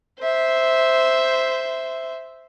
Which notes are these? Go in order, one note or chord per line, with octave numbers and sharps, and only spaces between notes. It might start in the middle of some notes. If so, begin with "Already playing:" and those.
C5 E5